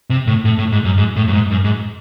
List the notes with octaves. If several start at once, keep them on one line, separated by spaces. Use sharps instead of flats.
C3
A2
A2
A2
G#2
F#2
G#2
A2
F#2
G#2
F#2
G#2